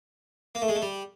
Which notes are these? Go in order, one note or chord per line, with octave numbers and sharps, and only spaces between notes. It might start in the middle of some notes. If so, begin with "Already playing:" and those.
A#3
A3
G#3
A3
G3